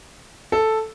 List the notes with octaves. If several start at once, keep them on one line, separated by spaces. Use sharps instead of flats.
A4